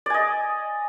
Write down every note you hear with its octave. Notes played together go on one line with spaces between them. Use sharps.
D5 D#5 G#5